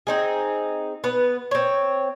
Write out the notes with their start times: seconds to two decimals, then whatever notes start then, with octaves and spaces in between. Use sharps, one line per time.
0.07 C4 D#4 G#4
1.04 B3 B4
1.51 C4 C#5